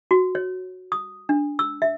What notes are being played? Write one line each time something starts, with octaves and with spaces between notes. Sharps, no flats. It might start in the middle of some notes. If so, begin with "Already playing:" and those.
F#4
C#5
D#6
D4
E6
E5